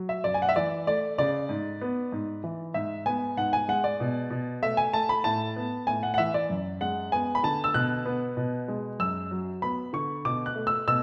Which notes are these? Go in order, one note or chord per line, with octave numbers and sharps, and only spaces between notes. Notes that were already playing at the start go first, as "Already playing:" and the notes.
Already playing: F#3
E5
F#2 D5
G#5
F#5
E5
E3 D5
A3 D5
C#3 D5
G#2
B3
G#2
E3
G#2 E5
B3 G#5
G#2 F#5
G#5
G#3 F#5
D5
B2
B2
A3 E5
G#5
A3 A5
B5
A2 A5
B3
A2 G#5
F#5
F#5
E3 E5
D5
F#2
G#3 F#5
B3 G#5
B5
D3 A5
E6
B2 F#6
B3
B2
G#3
F#2 E6
F#3
B3 B5
D3 C#6
B2 D6
F#6
A3
E6
B2 E6